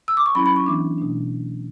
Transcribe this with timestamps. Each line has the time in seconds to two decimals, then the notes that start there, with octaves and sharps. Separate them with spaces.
0.08 E6
0.17 D6
0.26 C#6
0.35 F#3 C#4 E4 B5
0.46 B5
0.56 C#6
0.66 E3 B3 D4 D6
0.98 B2 A3 D4